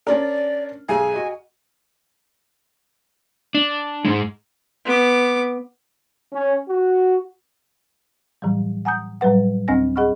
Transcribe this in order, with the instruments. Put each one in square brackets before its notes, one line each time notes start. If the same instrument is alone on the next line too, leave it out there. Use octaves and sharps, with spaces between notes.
[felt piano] C#4 D4 A#4 [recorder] D5
[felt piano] B1 G#3 G#4 [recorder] G#5
[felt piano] F#4 D#5
[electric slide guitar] D4
G#2 C#3 G#3
[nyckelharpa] B3 D6
[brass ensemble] C#4
F#4
[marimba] A2 E3 F#3 G3
F#5 G#5 A#5 D#6 G6
A2 F#3 G3 B4 F#5
D2 C4 D4 F#5 G#5 A#6
G#4 D#5 F#5 B5 C#6 F6